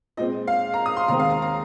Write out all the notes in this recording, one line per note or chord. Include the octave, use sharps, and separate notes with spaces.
A#2 G#3 C4 D#5
F5
A#5
D#6
C6
D#2 D#3 G#3 C4 A#5
F5
A#5
A#5